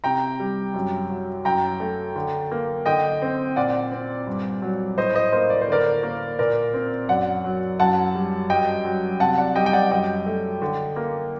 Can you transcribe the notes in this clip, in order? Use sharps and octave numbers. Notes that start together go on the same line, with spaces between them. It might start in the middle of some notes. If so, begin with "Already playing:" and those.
C3 G5 A#5
G3
F#2
F#3
F#2 G5 A#5
A3
D3
A#3
D3 D#5 G5
C4
A#2 D5 F#5
C4
G2
F#3
A2 C5 D#5
C5 D#5
A#3 C5 D#5
D5
C5
D3 A#4 D5
A#3
A#2 A#4 D5
C4
F#2 D5 F#5
F#3
F#2 F#5 A5
G3
G2 D#5 G5
F#3
C3 F#5 A5
D5 F#5
G3 D#5 G5
G5
D5 F#5
F#2 D#5 G5
A3
D3
A#3